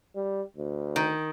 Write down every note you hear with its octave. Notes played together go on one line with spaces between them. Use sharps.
G3
D2
D#3